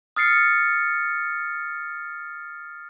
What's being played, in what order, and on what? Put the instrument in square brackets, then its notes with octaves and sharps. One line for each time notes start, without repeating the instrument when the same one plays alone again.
[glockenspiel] D#6 F6 A6 C7 C#7